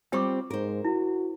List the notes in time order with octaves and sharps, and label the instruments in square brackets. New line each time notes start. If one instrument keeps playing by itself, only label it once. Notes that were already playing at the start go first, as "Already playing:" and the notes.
[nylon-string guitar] G3 C4 F4 [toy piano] G5 C#6 D6
[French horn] G#2 [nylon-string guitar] A#4 C5
[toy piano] E4 [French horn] F#4